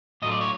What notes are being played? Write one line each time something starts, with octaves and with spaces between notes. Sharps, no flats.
A2 F#3 A3 D4 F4 D#5
D5
C#5